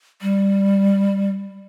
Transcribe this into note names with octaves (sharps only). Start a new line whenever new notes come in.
G3